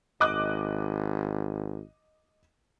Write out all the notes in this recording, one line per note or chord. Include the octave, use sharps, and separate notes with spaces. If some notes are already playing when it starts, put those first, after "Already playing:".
G#1 D#5 D6 F#6